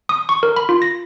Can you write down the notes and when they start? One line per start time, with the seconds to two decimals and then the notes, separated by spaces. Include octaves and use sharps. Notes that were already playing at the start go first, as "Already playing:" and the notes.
0.09 D#6
0.29 C#6
0.43 A#4
0.56 B5
0.69 F4
0.82 A#6